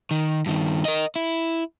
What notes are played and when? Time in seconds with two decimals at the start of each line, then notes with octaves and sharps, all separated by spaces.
0.11 D#3
0.46 G2 D#3
0.85 A#4 D#5
1.16 E4